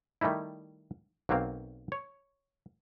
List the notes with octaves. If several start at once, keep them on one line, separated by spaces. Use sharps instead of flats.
D#3 G3 A3 D#4 E4
B1 F#3 A#3 C4 F5
C#5